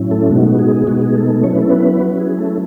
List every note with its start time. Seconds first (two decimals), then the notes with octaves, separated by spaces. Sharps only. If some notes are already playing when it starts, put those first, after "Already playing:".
Already playing: A2 F#3 C#4 E4
0.11 A3 A4
0.30 B2 G#3 B3 D#4 F#4
0.59 G#4
0.86 B2 G#3 B3 D#4 F#4
1.02 G#4
1.15 A3 A4
1.29 A3 A4
1.43 F#3 C#4 E4 C#5
1.52 B4
1.61 A4
1.69 B3 B4
2.00 F#3 C#4 E4 F#4
2.19 G#4
2.38 A3 A4